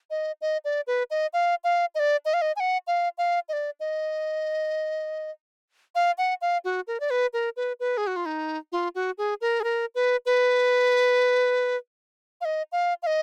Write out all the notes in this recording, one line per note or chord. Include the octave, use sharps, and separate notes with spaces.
D#5
D#5
D5
B4
D#5
F5
F5
D#5
D5
D#5
F5
D#5
G#5
F#5
F5
F5
D#5
D5
D#5
F5
F#5
F5
F#4
A#4
D5
B4
A#4
B4
B4
G#4
F#4
F4
D#4
F4
F#4
G#4
A#4
G#4
A#4
B4
B4
F5
D#5
F5
F5
D#5